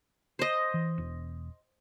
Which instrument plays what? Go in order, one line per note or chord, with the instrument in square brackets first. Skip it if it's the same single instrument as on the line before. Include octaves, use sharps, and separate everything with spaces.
[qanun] C5 D#5
[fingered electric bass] E3
E1